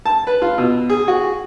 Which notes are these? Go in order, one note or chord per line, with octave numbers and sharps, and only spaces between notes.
A5
B4
F4
B2
G#4
F#4